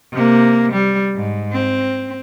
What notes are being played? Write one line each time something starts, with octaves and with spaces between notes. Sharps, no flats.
C3 A#3
G3
G#2
C4